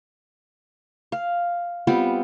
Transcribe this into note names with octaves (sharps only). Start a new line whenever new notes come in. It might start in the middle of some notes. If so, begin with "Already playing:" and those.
F5
G3 B3 C4 F4